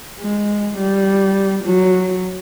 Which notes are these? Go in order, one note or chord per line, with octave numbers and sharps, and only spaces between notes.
G#3
G3
F#3